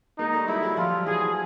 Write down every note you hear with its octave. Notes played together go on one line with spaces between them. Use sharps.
G#3 A#3 D#4
G3 A3
F#3 G#3 E4
F#3 G#3
F3 G3 F4
F3
E3 F#3 G#4